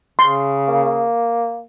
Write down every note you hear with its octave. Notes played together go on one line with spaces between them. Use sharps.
C#3 C6
A#3